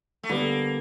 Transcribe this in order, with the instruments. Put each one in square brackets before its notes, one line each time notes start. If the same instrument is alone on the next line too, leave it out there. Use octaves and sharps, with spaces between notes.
[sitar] A3
[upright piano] D3 G3 B3 [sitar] A#3